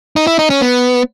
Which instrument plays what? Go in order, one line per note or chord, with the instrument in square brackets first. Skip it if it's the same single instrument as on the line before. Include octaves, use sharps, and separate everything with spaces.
[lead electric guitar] D#4
E4
D#4
C#4
B3